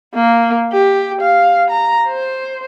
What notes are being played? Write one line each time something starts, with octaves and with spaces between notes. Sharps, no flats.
A#3
G4
F5
A#5
C5